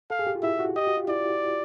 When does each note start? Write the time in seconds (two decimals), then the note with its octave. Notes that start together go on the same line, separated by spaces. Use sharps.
0.10 A4 F5
0.19 G#4
0.27 G4
0.35 F4
0.43 E4 E5
0.59 F#4
0.76 G4 D#5
0.87 F#4
0.97 F4
1.08 E4 D5